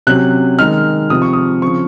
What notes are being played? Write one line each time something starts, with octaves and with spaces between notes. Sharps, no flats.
C3 F#3 C#4 F#6
D#3 G#3 D#4 F6
C3 F3 C4 D#6
C#6
D#6
C#3 F3 C4 C#6